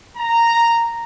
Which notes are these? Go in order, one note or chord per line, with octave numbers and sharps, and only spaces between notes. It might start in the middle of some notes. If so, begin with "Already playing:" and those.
A#5